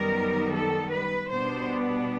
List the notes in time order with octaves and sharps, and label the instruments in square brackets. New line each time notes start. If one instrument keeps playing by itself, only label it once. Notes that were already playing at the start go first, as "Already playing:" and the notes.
Already playing: [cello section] F#2 D#3 G3 B3 A#4
A4
B4
B2 G3 B3 D4 C5